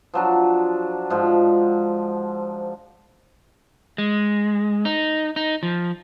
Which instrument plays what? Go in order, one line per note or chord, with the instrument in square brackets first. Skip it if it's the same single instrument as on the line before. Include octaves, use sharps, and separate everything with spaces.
[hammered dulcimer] F3 F#3 D4
G#2 F3
[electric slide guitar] G#3
D#4
D#4
F3